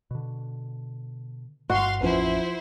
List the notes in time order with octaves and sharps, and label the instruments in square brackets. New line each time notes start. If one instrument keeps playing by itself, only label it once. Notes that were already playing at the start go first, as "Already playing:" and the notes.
[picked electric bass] B2 D3
[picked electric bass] G1 G2 [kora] F#4 [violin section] F5 C6
[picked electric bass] A1 F2 C#4 [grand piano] F3 B4 [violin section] E4 C5